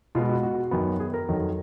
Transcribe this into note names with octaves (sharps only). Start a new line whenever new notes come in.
B2 G#3 B3 F4
F#4
F#4
F#2 D#3 F#3 B3
G#4
A#4
F2 D#3 F#3